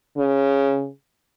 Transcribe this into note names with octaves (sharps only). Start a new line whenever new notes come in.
C#3